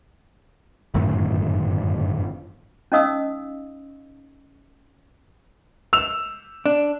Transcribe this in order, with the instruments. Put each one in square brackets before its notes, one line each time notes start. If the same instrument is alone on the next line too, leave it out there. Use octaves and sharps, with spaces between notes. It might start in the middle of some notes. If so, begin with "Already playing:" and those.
[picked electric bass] G1 F#2 A2 D#3
[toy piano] C#4 D#4 D#5 F5 D#6 E6
[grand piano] E6 F7
[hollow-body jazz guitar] D4